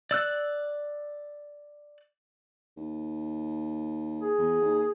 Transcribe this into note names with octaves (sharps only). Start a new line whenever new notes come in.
D5 E6 F#6
D#2
G#4
E2
D#2